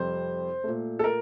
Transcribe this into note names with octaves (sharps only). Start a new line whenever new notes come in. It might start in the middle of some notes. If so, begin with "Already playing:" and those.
Already playing: F2 C3 G3 C5
A#2 A3
A4
A#4